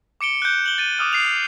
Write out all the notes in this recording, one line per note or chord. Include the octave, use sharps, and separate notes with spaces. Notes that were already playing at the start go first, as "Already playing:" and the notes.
D6 C#7 D7 G7
F#6 G6
F#7 G7
A6 D#7
D6 D#6 F6 D#7
C7 F7